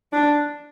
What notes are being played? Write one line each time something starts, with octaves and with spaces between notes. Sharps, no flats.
D4